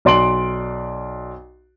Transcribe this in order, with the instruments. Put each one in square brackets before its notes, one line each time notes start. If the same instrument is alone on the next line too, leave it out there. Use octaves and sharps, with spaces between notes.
[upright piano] B1 D5 C6 D7 F#7